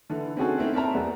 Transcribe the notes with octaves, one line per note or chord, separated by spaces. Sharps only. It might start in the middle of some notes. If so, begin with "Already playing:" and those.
D3 E3 A4
C4 C#4 D#4 F#4 G#4 A4
A3 A#3 C4 C#4 D#4 E4
C4 A4 A#4 E5 A5 A#5
E2 G3 B3